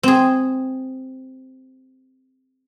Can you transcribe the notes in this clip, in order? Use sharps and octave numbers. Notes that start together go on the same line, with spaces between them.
C4 G#4